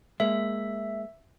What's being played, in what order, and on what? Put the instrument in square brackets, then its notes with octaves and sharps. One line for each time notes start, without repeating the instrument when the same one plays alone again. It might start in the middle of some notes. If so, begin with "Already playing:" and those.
[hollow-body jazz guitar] G#3 A#3 [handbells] E5